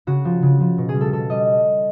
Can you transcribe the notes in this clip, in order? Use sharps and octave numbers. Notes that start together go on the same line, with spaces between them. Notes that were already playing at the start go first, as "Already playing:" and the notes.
C#3 F#4
F3
C#3
F3
B2
G#4
G3
A4
B2 A4
G3 D#5